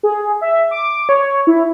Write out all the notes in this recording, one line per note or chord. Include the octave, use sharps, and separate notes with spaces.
G#4
E5
D6
C#5
E4